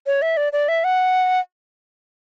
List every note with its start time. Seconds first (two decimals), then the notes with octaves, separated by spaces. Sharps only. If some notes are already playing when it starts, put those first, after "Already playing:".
0.07 C#5
0.22 E5
0.37 D5
0.53 D5
0.68 E5
0.84 F#5